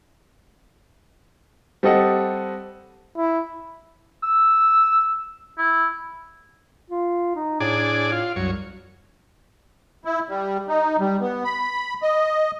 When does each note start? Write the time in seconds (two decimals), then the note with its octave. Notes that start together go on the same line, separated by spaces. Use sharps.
1.83 G3 C4 G4 A4 D#5 F#5
3.17 E4
4.23 E6
5.58 E4
6.90 F4
7.35 D#4
7.60 A2 D4 G#4 D5
8.12 F4
8.36 C2 F#2 C#5
10.05 E4
10.29 G3
10.68 D#4
11.00 G3
11.21 B3
11.44 B5
12.03 D#5